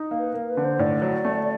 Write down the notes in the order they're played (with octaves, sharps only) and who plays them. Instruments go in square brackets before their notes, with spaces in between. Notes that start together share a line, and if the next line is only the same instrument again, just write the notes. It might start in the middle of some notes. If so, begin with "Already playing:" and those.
Already playing: [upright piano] D#4
A#3
[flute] B4
[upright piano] A#3 [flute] A#4
[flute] B4
[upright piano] D3
[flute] C5
[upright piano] A2 [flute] D5
[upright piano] F#3
A3